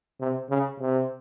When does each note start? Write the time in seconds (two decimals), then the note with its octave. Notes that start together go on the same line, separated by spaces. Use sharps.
0.20 C3
0.50 C#3
0.80 C3